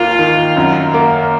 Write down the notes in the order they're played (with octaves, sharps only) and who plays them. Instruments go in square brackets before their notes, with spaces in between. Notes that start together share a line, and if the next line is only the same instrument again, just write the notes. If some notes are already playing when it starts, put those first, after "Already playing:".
Already playing: [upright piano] D#2 A#3 [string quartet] F4
[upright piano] D#3
F#2
A#3